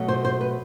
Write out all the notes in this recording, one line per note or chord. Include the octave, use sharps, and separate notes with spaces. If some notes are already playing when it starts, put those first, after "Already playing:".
Already playing: B2 F#3 A3
C5
C5
B4